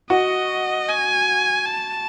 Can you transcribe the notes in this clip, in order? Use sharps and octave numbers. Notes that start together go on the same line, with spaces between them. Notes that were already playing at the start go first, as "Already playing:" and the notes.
F#4 D#5
G#5
A5